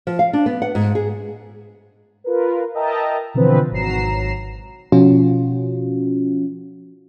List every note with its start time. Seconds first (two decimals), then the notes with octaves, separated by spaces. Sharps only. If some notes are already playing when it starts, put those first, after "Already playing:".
0.07 F3
0.19 F5
0.33 D4
0.46 B3
0.62 F#5
0.75 G#2
0.95 G#4
2.24 F4 A#4 B4
2.74 A#4 D#5 E5 G5 A5 A#5
3.34 B2 D3 E3 F3 C4 B4
3.71 G#1 F#3 A#5 C7 E7
4.92 B2 F3 C#4 F4 F#4